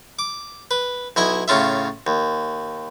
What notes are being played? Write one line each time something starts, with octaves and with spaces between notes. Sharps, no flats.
D6
B4
B1 E4 D#5 G#5
A2 C#3 F4 E5
D#2